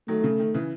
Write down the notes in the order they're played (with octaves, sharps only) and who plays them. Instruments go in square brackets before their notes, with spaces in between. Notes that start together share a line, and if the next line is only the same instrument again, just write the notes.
[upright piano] D#3 F#3 [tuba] A3
[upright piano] C#3
D#3
C#3 E3